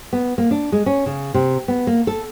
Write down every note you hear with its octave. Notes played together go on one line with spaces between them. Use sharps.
B3
A#3
D4
G#3
C#4
C#3
C3
B3
A#3
A4